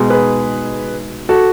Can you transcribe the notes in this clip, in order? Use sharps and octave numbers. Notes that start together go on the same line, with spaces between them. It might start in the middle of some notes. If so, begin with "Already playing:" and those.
Already playing: B2 G#3 D#4
G#4 B4
F#4 A4